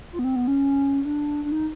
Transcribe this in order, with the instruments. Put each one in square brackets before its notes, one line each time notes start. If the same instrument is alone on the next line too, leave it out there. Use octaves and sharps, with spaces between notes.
[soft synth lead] F4
B3
C4
B3
C#4
D4
D4
D#4